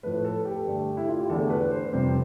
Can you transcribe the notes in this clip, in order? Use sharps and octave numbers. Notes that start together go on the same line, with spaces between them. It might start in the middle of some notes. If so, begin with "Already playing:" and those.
A2 F3 A3 B4
A4
G4
G2 D3 A3
E4
F4
G4
E2 D3 A3 A4
A4
B4
C5
F2 C3 G3 C5